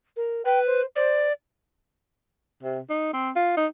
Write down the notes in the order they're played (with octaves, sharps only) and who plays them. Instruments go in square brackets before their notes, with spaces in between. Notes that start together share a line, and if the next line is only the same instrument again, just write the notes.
[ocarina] A#4
[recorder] B4 [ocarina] G5
[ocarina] C5
[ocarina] C5 [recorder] D5
[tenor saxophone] C3
D#4
C4
F4
D#4